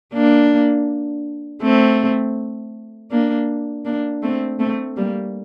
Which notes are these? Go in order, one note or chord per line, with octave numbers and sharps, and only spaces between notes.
A#3 D4
A3 C4
A#3 D4
A#3 D4
A3 C4
A3 C4
G3 A#3